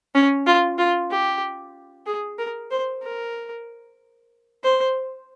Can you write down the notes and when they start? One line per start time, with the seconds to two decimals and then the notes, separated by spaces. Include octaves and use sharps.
0.15 C#4
0.46 F4
0.78 F4
1.11 G4
2.06 G#4
2.38 A#4
2.71 C5
3.03 A#4
4.64 C5